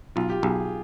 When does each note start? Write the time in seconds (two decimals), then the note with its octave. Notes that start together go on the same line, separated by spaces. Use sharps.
0.16 B1 F4
0.30 G4
0.43 B1 G#4